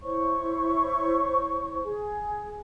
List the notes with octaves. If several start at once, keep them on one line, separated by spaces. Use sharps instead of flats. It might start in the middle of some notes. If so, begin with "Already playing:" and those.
E4 C5 C#5 C#6
G#4